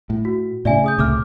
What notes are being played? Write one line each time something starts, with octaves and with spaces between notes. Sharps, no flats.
A2
F#4
A2 C#3 D5 E5 G#5
G#4 D#6 G6
C#2 A2 C3 D6 F6